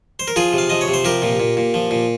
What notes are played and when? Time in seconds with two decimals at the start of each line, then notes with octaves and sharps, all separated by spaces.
0.19 C5
0.28 A#4
0.36 F3 F4 G#4
0.53 C3
0.58 F5
0.70 F3 D#5
0.81 C#5
0.88 C3
0.94 C5
1.04 F3 G4 A#4
1.22 A#2
1.40 A#2
1.57 A#2
1.74 F3
1.91 A#2